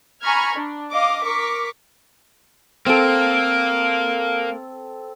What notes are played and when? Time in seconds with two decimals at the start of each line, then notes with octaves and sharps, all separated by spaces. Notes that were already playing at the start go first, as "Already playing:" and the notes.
0.23 G#5 A#5 B5 C#6 F6 G#6
0.55 D4
0.90 D#5 F5 D6
1.24 A#4 C#6 D6 B6
2.86 A#3 C4 A4